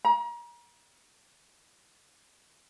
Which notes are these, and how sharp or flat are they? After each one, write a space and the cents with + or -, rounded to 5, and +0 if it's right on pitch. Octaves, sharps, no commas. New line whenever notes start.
A#5 +35